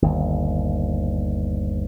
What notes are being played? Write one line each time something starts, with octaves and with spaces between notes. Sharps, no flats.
G1 D#2